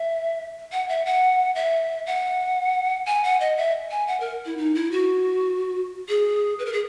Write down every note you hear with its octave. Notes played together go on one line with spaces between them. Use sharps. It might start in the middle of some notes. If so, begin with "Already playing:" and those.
Already playing: E5
F#5
E5
F#5
E5
F#5
G#5
F#5
D#5
E5
G#5
F#5
A#4
E4
D#4
E4
F#4
G#4
B4
A#4
G#4